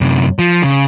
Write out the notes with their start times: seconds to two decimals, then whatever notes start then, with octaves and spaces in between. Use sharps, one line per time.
0.01 F#2 C3
0.39 F3
0.63 C#3